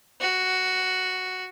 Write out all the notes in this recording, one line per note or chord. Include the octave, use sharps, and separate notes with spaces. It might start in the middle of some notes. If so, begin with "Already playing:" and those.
F#4